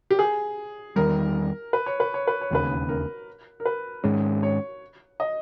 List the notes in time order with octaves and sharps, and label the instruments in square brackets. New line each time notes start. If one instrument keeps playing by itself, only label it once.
[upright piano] G4
G#4
[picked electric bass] E2 D#3 G3 [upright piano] A#4
[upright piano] B4
C#5
B4
C#5
B4
C#5
[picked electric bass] E1 D#2 C#3 [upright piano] B4
[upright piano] A#4
A#4
B4
[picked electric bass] G#2 D#3 G#3 C#4
[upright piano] C#5
D#5